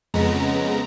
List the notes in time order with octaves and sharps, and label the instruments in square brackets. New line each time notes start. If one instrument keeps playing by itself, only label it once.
[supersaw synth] F2 C#3 G#3 B3 A#5